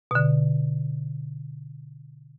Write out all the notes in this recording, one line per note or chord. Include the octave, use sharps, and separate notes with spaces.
B2 D3